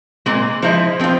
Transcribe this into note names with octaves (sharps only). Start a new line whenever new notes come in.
A#2 G#3 C4
F3 G#3 E4 C5
F3 C4 F4